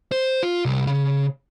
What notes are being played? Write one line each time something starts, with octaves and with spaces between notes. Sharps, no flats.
C5
F4
C2
C#3